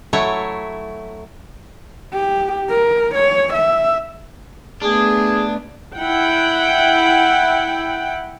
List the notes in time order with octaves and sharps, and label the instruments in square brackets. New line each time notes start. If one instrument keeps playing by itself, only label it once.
[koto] F#3 A3 E4 C#5
[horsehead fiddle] G4
A#4
C#5
E5
[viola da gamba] A3 B3 [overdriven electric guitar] D4 [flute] G#4
[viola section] E4 F#5 G5